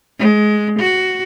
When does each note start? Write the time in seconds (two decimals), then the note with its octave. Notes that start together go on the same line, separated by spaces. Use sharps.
0.20 G#3
0.79 F#4